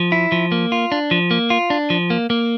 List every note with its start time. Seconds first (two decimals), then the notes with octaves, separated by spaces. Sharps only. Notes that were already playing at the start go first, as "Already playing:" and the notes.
Already playing: F3
0.12 E4
0.32 F3
0.52 A#3
0.72 F4
0.92 D4
1.11 F3
1.31 A#3
1.50 F4
1.70 D4
1.90 F3
2.10 A#3
2.30 A#3